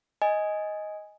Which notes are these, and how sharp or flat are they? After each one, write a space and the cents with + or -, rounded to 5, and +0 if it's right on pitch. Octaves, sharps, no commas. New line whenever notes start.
D#5 +10 G#5 +0